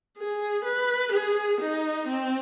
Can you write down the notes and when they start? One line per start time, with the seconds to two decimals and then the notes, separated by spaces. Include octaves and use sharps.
0.18 G#4
0.64 B4
1.12 G#4
1.60 D#4
2.08 C4